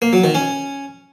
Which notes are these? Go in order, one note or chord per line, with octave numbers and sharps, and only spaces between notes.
A#3
F#3
D#3
C#4